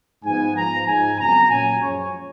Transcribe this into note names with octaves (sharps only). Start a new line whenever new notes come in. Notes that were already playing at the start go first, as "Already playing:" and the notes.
G#2 F3 B3 G#5
G#2 F3 B3 A#5
G#2 F3 G#3 G#5
F2 C#3 F#3 B3 A#5
A#2 F#3 C#4 G#5
F#2 F3 G#3 C#4 C#5